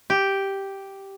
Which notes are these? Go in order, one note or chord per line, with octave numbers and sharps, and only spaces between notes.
G4